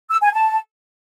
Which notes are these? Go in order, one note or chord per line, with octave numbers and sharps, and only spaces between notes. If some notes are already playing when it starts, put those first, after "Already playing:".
E6
G#5
A5